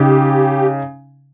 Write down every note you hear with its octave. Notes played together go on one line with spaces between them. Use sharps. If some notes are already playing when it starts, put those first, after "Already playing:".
Already playing: C#3 D#4 G4